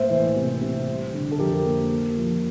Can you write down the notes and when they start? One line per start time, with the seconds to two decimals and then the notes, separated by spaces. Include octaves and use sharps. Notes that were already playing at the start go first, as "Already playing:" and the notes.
Already playing: A2 A#3 C5 E5
0.10 E3
0.36 C3
0.61 C3
0.87 G3
1.13 D3
1.32 A4
1.39 F2 G4 A#4
1.65 A#3
1.92 A#3
2.17 F3